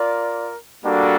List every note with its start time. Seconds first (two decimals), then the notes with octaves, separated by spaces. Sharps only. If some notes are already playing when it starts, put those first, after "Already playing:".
Already playing: F4 A#4 D5
0.83 G3 A#3 D4 F#4 A4